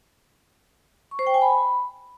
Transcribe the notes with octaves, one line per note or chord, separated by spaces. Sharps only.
C#6
C5
G5
G#5
B5